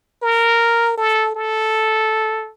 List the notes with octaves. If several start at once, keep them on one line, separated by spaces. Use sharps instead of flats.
A#4
A4
A4